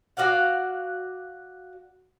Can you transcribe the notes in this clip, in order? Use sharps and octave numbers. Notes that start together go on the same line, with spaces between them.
F#4 D5 F5 F#5